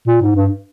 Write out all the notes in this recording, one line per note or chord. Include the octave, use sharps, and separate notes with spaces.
A#2
G#2
G2